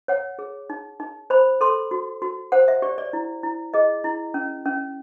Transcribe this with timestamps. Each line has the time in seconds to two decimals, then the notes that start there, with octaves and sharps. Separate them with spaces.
0.08 C#5 F#5
0.39 G#4
0.70 D#4
1.00 D#4
1.30 C5 B5
1.61 A4 C6
1.91 F#4
2.22 F#4
2.52 C5 F#5
2.68 E5
2.82 G4 D5
2.98 D5
3.13 E4
3.43 E4
3.74 G#4 D#5
4.04 E4
4.34 C#4
4.65 C#4